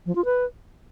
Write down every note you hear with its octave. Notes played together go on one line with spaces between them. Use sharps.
F3
F4
B4